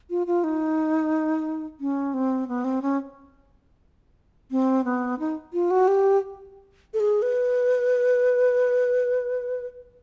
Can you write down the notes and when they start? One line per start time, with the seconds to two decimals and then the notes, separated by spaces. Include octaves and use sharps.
0.10 F4
0.27 F4
0.44 D#4
1.80 C#4
2.14 C4
2.48 B3
2.64 C4
2.82 C#4
4.51 C4
4.85 B3
5.19 D#4
5.53 F4
5.71 F#4
5.88 G4
6.94 A4
7.00 G#4
7.22 B4